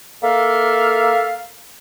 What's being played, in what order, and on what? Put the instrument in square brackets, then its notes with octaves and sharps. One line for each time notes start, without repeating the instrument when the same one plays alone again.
[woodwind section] A#3 A4 E5 F5